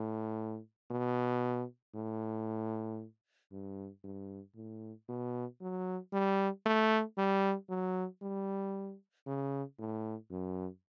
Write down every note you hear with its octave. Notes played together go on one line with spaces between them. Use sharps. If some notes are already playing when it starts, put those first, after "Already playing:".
Already playing: A2
B2
A2
G2
G2
A2
B2
F#3
G3
A3
G3
F#3
G3
C#3
A2
F#2